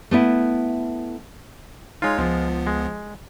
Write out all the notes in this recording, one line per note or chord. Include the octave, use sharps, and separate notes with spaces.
A3 B3 E4
G#3 D#4 F4 C#5
C#2 F3 B3
G#3